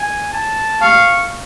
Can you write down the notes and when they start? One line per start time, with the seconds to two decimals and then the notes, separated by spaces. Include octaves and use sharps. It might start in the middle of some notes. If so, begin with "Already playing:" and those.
Already playing: G#5
0.33 A5
0.82 F5 C#6